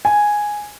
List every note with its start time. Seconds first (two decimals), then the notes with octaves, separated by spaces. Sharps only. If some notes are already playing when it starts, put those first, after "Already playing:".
0.05 G#5